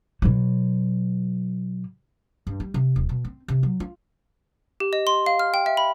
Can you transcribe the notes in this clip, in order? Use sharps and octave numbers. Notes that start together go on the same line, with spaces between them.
B2 F#3
G2
G3
C3
D#1
B2
C4
C3
F#3
F4
G4
D#5
C6
F5
F6
G5
E5
B5